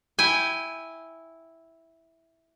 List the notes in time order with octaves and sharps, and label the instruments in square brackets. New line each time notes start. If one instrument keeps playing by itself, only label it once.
[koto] E4 G5 G#5